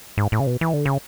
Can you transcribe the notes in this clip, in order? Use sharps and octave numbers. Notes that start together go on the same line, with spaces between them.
G#2
A2
C#3
B2
E3
D3
C#3